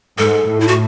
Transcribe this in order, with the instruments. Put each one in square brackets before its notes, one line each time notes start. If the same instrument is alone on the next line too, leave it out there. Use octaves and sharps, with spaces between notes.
[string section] G#2 [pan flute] A4
[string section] A2
[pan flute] E4
F#4